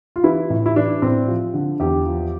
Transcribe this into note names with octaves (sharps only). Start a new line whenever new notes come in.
F4
E3 E4
A2
E4
E3 D4
A2 C4
F3
D3
E2 G4
F3